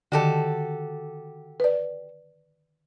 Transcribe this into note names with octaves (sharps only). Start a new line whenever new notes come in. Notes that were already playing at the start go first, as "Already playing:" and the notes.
D3 D#3 F#4 G4 A4
B4 D5